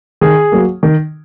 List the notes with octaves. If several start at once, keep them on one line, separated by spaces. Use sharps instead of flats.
D#3 G#4
F#3 A#3
D#3